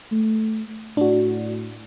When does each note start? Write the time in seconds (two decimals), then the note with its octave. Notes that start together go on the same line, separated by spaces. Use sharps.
0.12 A3
0.97 A2 D4 F#4